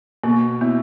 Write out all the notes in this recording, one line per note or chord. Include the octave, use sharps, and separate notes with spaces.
B2 A#3
B3 E4